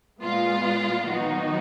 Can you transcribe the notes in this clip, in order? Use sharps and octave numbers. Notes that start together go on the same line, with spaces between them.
A#2 G#3 B3 F4
D#3 F#3 B3 D#4 F#4